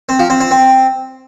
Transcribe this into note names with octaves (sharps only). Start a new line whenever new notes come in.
C4
F3
C4
C4
C4